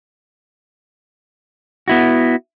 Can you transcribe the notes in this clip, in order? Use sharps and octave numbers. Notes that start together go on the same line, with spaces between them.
B3 E4 F#4